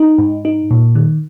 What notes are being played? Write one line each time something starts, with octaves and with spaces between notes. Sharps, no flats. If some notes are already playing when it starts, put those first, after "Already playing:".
Already playing: D#4
G#2
D#4
A#2
D#3